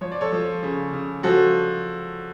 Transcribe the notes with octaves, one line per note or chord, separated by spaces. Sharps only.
F3 C#5
D5
A4 C#5
F3
C#3
C#3
F3 F#4 A4